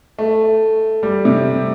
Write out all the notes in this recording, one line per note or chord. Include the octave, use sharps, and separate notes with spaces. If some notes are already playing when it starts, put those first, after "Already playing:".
A3
G3
C3